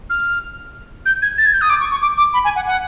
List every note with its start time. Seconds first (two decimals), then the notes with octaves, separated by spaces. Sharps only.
0.10 F6
1.06 G6
1.22 G#6
1.38 A6
1.46 G#6
1.53 G6
1.61 D#6
1.70 D6
1.80 C#6
1.91 C#6
2.02 D6
2.17 D6
2.33 B5
2.44 G#5
2.56 F#5
2.67 F#5